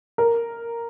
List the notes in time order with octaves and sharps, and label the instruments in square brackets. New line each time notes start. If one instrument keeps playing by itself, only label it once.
[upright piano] A#4